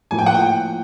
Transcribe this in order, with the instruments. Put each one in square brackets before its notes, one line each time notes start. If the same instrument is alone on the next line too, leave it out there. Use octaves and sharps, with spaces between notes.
[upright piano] A2 F3 A#3 [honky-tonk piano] G#5
[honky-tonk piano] G5
F#5
G5